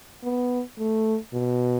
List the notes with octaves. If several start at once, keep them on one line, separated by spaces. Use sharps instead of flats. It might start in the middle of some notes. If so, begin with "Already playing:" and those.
B3
A3
B2